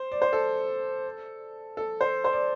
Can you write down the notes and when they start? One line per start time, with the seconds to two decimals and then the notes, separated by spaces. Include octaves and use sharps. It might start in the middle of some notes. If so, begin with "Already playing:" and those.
Already playing: C5
0.12 D5
0.22 C5
0.33 A4
1.77 A4
2.01 C5
2.24 C5
2.33 D5